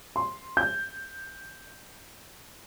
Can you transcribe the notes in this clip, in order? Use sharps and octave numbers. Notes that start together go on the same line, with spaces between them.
C6
G6